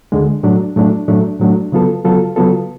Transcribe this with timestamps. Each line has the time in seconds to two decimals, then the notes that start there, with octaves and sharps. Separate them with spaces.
0.12 D2 D3 G#3
0.43 A2 F#3 A3 D4
0.76 A2 F#3 A3 D4
1.08 A2 F#3 A3 D4
1.40 A2 F#3 A3 D4
1.72 C#3 F#3 B3 F4 A4
2.04 C#3 F#3 B3 F4 A4
2.36 C#3 F#3 B3 F4 A4